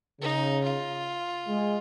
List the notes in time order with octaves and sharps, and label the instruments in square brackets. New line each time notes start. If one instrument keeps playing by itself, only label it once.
[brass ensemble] C#3 [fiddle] D#4
[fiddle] F4
[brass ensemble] G#3